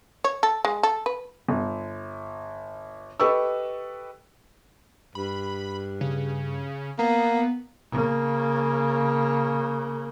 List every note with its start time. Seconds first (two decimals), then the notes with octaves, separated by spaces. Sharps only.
0.24 C#5
0.43 A4
0.65 G#3
0.83 A4
1.06 B4
1.49 G1
3.20 G4 A4 B4 D#5 C#6 E6
5.15 G2 B5
6.01 C#3
6.99 A#3 B3
7.90 C#3 A#3